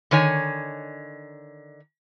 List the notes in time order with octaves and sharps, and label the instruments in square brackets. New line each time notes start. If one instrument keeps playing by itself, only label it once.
[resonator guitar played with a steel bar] D3 D#3 C#5 G#5